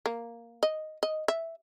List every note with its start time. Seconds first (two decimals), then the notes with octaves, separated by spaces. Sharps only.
0.06 A#3
0.63 D#5
1.03 D#5
1.28 E5